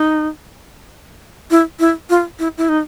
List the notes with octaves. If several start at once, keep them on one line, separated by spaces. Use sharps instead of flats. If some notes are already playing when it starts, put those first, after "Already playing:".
Already playing: D#4
E4
E4
F4
E4
E4
D#4